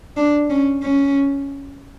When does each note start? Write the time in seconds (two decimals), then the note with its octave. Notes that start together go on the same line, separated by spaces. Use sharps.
0.17 D4
0.50 C#4
0.83 C#4